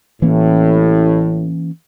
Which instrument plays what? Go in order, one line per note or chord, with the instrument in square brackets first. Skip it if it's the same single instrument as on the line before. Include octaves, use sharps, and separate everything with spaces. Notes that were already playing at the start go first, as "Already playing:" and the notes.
[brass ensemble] A1 A2 [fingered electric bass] E3 A#3 C#4